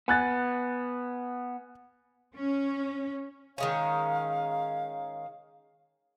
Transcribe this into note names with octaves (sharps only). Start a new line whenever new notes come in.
B3 G#5 F#6 A6
C#4
D#3 G#3 C#4 F5